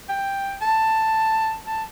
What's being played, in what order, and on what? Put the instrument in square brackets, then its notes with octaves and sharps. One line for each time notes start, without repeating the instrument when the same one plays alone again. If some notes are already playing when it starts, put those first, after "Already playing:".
[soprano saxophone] G5
A5
A5